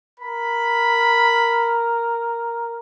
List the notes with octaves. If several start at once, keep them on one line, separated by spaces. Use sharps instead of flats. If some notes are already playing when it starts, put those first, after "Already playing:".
A#4 B5